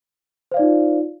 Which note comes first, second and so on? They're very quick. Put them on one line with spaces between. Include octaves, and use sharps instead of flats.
C5 F5 D5 D#4 F4